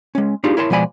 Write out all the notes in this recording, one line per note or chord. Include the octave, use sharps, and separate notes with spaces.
G#3 C#4
D4 D#4 F4 G4 G#4
E4 A#4 C#5 A5 C6
B2 F3 G#3 D5 G#5 B5